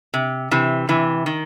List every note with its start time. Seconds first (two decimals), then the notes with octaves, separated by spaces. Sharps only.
0.14 C3
0.51 C3 E3
0.89 C3 E3
1.26 D#3